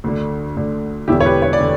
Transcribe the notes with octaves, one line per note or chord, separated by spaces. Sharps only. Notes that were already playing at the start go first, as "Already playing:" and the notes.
D2 D3
D2 D3
E1 E2 D3 E4 G4
C#5
G4 B4
C#5
D5
D3